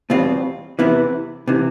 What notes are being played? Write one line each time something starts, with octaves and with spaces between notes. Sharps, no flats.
E2 B2 G3 C4 F4
E2 C3 E3 B3 E4
C3 E3